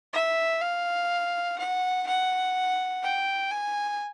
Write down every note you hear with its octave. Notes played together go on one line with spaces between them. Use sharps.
E5
F5
F#5
F#5
G5
G#5